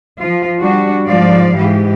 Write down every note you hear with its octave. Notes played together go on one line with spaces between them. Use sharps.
F3 F4
G3 D4 F#4
G#2 F3 D5 F5
G#2 E3 G4